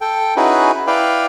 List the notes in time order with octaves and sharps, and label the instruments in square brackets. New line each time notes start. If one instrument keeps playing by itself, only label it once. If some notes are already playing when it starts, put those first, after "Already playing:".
[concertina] A4 G5
C#4 D#4 E4 F#4 G#4 B4
E4 B4 D5 F5 G5